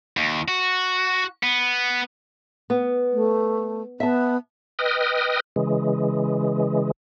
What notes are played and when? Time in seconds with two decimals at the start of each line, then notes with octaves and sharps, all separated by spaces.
0.17 D#2
0.48 F#4
1.43 B3
2.70 B3
3.12 A3
4.00 B3 E5 A5
4.79 B4 D#5 G5 D#6 F6
5.56 C#3 E3 G#3